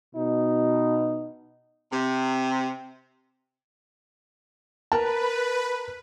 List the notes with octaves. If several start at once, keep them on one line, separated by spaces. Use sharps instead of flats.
B2 D#4
C3
A#4 B4 A5